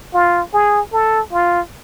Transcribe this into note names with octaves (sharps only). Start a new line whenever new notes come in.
F4
G#4
A4
F4